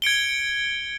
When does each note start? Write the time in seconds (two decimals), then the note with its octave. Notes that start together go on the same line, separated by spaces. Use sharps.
0.02 G#6 C#7 D7 G7